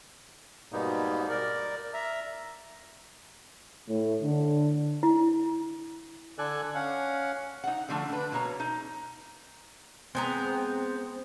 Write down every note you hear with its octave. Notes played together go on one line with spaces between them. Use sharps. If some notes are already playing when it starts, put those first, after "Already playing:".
G#2 B2 G3 A#3 B3 D#4
A#4 D5
E5 A#5
A2
D3
E4
D3 A4 D5 G#5 F#6
C#4 F5 F#5
D#4 F#5
D3 F3 A3 D4
D4 B4
B2 A#3 C#5 A#5
D#4
G#3 B3 C4 A#5